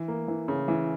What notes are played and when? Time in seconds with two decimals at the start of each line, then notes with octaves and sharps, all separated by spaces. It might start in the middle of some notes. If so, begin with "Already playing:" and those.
Already playing: E3
0.08 A#3
0.28 E3
0.48 C#3
0.68 E3